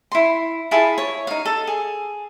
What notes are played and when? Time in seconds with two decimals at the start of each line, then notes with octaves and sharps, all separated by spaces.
0.12 E4 C6
0.71 E4 F4 G#4 A5
0.98 C#5
1.27 D#4 F5
1.45 A4
1.67 G#4